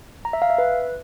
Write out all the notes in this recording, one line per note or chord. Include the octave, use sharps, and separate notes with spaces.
A#5
E5
F5
E5
B4